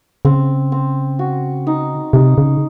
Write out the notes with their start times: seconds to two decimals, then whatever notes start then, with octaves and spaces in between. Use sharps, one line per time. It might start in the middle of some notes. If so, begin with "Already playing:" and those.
0.25 C#3 C4
0.72 C4
1.19 F#4
1.67 D#4
2.13 C3 D#4
2.38 C#3